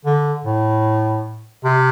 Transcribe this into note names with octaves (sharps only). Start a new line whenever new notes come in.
D3
A2
C3